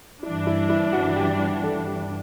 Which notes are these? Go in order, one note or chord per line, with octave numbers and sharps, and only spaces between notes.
G2 E3 G3 D4 E4
E4
E4
F#4
G4
A4
G4